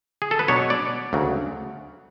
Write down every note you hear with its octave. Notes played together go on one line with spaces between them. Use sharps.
G#4
A4
B4
B2 F#3 B3 D4 C#5
D5
D2 C#3 F#3